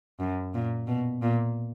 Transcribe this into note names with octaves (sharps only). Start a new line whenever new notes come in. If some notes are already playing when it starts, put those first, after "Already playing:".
F#2
A#2
B2
A#2